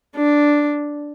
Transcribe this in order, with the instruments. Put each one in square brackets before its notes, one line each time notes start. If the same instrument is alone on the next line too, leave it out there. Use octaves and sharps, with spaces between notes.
[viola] D4